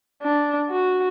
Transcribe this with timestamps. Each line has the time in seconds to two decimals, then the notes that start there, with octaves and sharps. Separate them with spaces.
0.23 D4
0.71 F#4